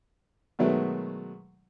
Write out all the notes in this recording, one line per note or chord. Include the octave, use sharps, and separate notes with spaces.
B2 D#3 F#3 G#3 A3 B3